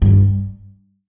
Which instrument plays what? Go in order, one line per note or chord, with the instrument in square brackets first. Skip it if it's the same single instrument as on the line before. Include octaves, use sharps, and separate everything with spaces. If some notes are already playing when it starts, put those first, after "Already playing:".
[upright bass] G2